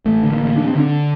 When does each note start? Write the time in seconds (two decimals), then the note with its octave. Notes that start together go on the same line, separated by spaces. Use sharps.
0.05 A1 A3
0.23 D3
0.31 A#3
0.40 A1
0.57 A1 D4
0.68 C4
0.75 D3 D4